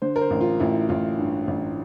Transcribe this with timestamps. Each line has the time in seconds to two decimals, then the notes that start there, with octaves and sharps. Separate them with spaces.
0.02 D3 C5
0.16 A#4
0.21 C5
0.30 A1
0.41 F4
0.60 A1 E4
0.89 A1 F4
1.18 G2
1.47 A1